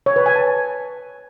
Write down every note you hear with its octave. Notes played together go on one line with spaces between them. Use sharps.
C#5
B4
G#5
A5